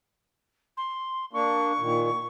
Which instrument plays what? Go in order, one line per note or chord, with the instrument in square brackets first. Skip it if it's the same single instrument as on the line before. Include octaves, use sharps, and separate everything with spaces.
[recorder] C6
[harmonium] A#3 D4 [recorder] C#6
[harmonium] A#2 D#3